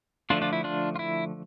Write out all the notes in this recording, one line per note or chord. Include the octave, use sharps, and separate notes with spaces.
D3 F3 A3 D4 F4
D4 F4
E4
D4 F4
F4
E4